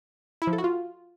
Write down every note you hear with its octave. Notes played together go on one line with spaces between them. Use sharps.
E4
F3
A4
F#4
F4